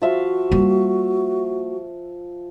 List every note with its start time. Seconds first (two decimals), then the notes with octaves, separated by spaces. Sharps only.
0.02 F3 F#4 E5 F5
0.52 G3 A#3